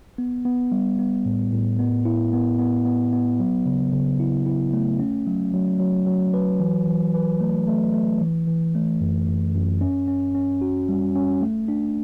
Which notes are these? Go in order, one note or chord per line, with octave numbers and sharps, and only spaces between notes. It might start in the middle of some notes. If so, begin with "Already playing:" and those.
B3
B3
G3
B3
A2
A2
B3
E4
B3
B3
B3
B3
F#3
C#3
C#3
E4
E4
A3
C#4
F#3
F#3
F#3
F#3
B4
E3
E3
B4
A3
A3
A3
E3
E3
A3
F#2
F#2
F#2
C#4
C#4
C#4
F#4
G3
C#4
A3
D4